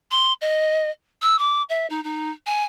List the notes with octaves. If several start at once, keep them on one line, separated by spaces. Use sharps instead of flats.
C6
D#5
E6
D6
E5
D#4
D#4
G#5